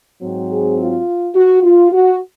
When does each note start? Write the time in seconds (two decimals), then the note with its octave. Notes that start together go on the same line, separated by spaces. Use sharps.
0.22 G#2 F#3 C4
0.51 G#4
0.79 F4
1.35 F#4
1.63 F4
1.92 F#4